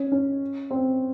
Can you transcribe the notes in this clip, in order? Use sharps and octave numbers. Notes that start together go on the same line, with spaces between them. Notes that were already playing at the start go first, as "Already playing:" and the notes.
Already playing: C#4
C#4
C4